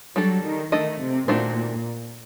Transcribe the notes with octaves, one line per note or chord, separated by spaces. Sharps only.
F#3 G3 D4 A4
D#3
D#3 A3 D4 A4 D#5
C3
A#2 D#3 A3 D4 F#4 C5